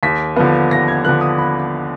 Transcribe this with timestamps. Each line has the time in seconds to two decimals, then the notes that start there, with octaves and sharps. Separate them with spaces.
0.03 D#2 B6
0.36 D3 F3 B3
0.71 D#2 A#6
0.88 G#6
1.05 D3 F3 B3 F#6
1.21 D#6
1.38 B5